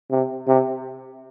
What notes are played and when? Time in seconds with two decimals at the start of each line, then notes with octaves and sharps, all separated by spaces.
0.11 C3
0.48 C3